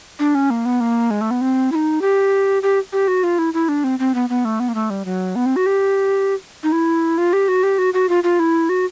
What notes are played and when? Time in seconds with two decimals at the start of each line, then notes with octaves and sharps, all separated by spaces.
0.19 D4
0.35 C#4
0.50 A#3
0.65 B3
0.81 A#3
1.11 G#3
1.21 A3
1.31 B3
1.41 C4
1.72 E4
1.75 D#4
2.01 G4
2.63 G4
2.93 G4
3.08 F#4
3.23 F4
3.39 E4
3.54 E4
3.69 D4
3.84 C4
3.99 C4
4.15 B3
4.29 B3
4.45 A3
4.60 B3
4.69 A#3
4.75 A3
4.90 G3
5.05 F#3
5.36 B3
5.46 C4
5.56 F#4
5.66 G4
6.63 D#4
6.72 E4
7.18 F4
7.33 G4
7.48 F#4
7.63 G4
7.78 F#4
7.94 F#4
8.09 F4
8.24 F4
8.39 E4
8.69 F#4